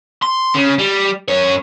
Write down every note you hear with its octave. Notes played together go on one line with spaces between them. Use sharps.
C6
C#3
G3
F#2 C#5